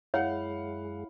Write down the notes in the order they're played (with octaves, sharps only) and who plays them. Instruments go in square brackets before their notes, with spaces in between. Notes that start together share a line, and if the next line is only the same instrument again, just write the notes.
[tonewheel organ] F#2 G#3 G#4 [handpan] E4 [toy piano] C#5 [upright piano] F5 F#5